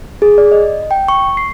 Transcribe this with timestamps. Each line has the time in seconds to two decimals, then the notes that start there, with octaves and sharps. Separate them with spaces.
0.22 G#4
0.38 D5
0.52 D#5
0.91 G5
1.08 C#6
1.37 C7